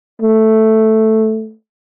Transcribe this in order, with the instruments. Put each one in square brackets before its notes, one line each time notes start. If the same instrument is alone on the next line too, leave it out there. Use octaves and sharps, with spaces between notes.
[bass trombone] A3